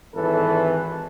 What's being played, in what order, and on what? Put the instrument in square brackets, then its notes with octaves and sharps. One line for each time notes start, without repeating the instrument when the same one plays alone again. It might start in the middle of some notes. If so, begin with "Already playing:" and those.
[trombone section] G#1 E3 A4 B4